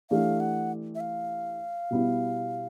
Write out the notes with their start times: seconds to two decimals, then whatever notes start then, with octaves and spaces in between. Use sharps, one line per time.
0.11 E3 A3 D4 G4 F5
0.40 F#5
0.95 E5
1.00 F5
1.90 B2 G3 B3 E4